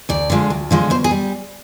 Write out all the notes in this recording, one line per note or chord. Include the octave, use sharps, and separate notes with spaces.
D2 D5
D3 F3 G#3
D2
D3 F3 G#3
B2 C5
G#4
G3